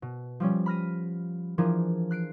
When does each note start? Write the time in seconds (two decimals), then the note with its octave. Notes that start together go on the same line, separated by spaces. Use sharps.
0.02 B2
0.40 F3 G3 C#4
0.66 B5 F6 A#6 D#7
1.58 E3 F3 D4 G#4 A#4
2.11 F#6 C7 D7